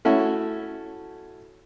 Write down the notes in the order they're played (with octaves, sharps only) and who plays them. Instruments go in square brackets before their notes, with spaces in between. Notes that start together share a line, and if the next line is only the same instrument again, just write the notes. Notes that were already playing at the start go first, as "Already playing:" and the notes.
[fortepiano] A3 C#4 E4 F#4